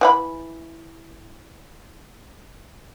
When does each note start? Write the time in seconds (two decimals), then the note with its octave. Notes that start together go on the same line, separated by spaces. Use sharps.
0.01 E3 F#5 B5